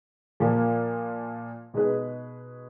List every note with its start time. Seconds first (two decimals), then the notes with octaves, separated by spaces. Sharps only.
0.40 A#2 F3 A#3
1.74 B2 G#3 D#4 G#4 B4